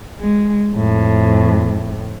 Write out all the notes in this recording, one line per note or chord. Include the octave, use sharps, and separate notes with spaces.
G#3
F2 A2